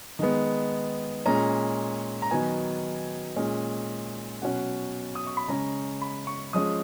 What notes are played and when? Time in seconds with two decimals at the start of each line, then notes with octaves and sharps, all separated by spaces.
0.19 D#3 G#3 B3
1.26 A#2 G#3 C#4 A#5
2.22 A#5
2.31 D#3 F#3 B3 G#5
3.36 A#2 G#3 C#4
4.42 B2 F#3 C#4 F#5
5.15 D#6
5.27 C#6
5.37 B5
5.48 C#3 G#3 C#4 A#5
6.02 B5
6.27 C#6
6.53 F3 G#3 C#4 D#6